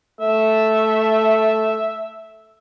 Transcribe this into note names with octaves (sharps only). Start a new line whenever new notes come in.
A3 E5